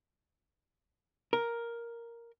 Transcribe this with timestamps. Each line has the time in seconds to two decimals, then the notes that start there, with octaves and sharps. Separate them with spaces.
1.33 A#4